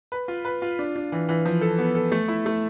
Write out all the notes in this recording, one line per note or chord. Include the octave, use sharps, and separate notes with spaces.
B4
F4
B4
F4
D4
D4
E3
E3
F3
A4
B3
A4
A3
E4
A3